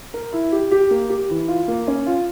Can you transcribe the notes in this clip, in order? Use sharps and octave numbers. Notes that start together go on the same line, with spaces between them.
A#4
E4
G4
G4
A#3
G4
E3
F4
A#3
C#4
F4